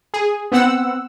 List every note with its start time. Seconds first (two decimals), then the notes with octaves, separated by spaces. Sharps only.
0.14 G#4
0.52 B3 C4 F#5 E6